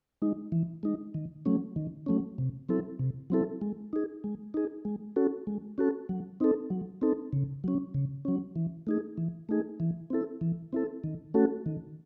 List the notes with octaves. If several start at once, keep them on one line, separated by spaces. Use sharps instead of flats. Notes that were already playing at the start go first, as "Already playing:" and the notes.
G#3 D#4
E3
G#3 D#4
D#3
F#3 A3 C#4
D#3
F#3 A3 C#4
C3
F#3 C4 E4 A4
C3
F#3 C4 E4 A4
G#3
D#4 G#4
G#3
D#4 G#4
G#3
C#4 F#4 A4
G#3
C#4 F#4 A4
F#3
C4 D#4 A4
F#3
C4 D#4 A4
C#3
F#3 C#4
C#3
F#3 C#4
E3
A3 D#4 G#4
E3
A3 D#4 G#4
E3
C4 E4 A4
E3
C4 E4 A4
D#3
A3 C#4 F#4 A4
D#3